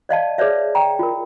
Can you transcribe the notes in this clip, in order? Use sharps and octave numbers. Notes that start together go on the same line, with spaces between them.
D5 D#5 F5 A5
G#4 B4 C#5 D5 E5
G5 A#5
F4 A#4